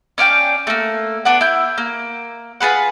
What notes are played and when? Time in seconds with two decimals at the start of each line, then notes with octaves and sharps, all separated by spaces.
0.18 C#4 D4 F5 G5
0.67 A3 A#3
1.25 B3 D4 F#5
1.41 E4 G6
1.78 A#3
2.61 F4 G#4 B4 F#5